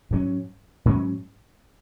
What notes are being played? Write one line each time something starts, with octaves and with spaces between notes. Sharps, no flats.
G#2 F#3 C#4
G#2 F#3 C#4